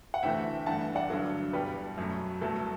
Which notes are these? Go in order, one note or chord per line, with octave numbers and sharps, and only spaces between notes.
F#5
D2 C3 E3 A3 E5 G5
G2 E3 A3 F#5 A5
D5 F#5
G2 D3 F#3 A4
E2 B2 G3 B4
F#2 F#3 A3
C2 B2 F#3 A3 A4